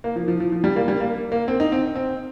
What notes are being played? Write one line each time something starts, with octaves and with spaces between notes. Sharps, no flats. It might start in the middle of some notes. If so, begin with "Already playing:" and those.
A#3
F3
F3
F3
F3
G3
A#3
G3
A#3
A#3
C4
D#4
C4
C4